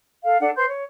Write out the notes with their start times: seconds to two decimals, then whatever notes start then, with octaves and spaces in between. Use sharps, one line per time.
0.24 A4 F5
0.40 D4 A4 F#5
0.56 B4 C5 C6 G6
0.68 C#5